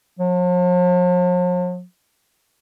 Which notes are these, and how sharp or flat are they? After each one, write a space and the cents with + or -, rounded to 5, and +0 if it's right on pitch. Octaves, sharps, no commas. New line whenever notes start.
F3 +45